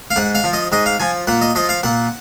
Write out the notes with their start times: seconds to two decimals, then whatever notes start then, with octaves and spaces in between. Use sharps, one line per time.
0.11 F5
0.16 G#2 F#5
0.35 F5
0.44 F3
0.53 D#5
0.72 G#2 D#5
0.86 F5
1.00 F3 G#5
1.27 A#2 F#5
1.41 D#5
1.55 F3 D#5
1.69 F5
1.83 A#2 F#5